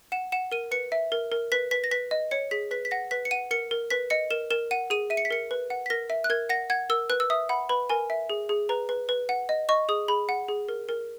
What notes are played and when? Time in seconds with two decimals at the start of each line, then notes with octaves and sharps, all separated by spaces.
0.12 F#5 E7
0.32 F#5 E7
0.52 A#4 D#7
0.71 B4 C#7
0.92 E5
1.12 A#4
1.32 A#4
1.52 B4 B6
1.71 B4 B6
1.84 A#6
1.91 B4 B6
2.11 D#5
2.31 C#5 C#7
2.51 G#4 B6
2.71 B4 B6
2.85 B6
2.91 F#5 A#6
3.11 B4 B6
3.25 C#7
3.31 F#5 D#7
3.51 A#4 C#7
3.71 A#4
3.90 B4 B6
4.10 D#5 C#7
4.31 A#4 E7
4.51 A#4 E7
4.71 F#5 D#7
4.90 G#4 D#7
5.10 E5 D#7
5.17 C#7
5.25 B6
5.31 A#4 C#7
5.51 B4
5.70 F#5
5.86 B6
5.90 A#4 A#6
6.10 E5
6.24 F#6
6.30 A#4 G#6
6.49 F#5 A#6
6.70 F#5 G#6
6.90 A#4 E6
7.10 B4 F#6
7.20 E6
7.30 E5 D#6
7.49 F#5 B5
7.69 B4 B5
7.89 A#4 G#5
8.10 E5
8.30 G#4
8.49 G#4
8.69 B4 A#5
8.89 B4
9.09 B4
9.29 F#5
9.49 D#5
9.69 D#5 C#6
9.89 G#4 D#6
10.08 G#4 B5
10.29 F#5
10.49 G#4
10.69 A#4
10.89 A#4